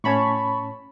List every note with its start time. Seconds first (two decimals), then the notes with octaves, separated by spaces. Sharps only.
0.04 A2 C#4 C#5 A5 B5 C#6